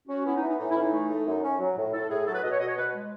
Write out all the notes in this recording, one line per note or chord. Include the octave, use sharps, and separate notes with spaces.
C#4 F#4
B3 E4
D#4
E3
D#4
A2 D#4
E4
E3 C#4
D#4
A3
A3
F#2
C#4
F#3
A2
A2 A4
A2 G#4
F#3 A4
B4
B2 D#5
C#5
B2 D#5
C#5
B2 B4
G#3